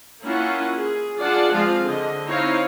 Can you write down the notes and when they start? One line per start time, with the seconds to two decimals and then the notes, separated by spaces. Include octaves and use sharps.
0.23 A#3 C#4 E4 F4 F#5
0.76 G#4
1.19 D4 F4 G#4 D5 F#5 A5
1.53 F3 G#3 C4 F4 G#4 F5
1.84 D3 D#5
2.27 C4 D#4 E4 C#5 F5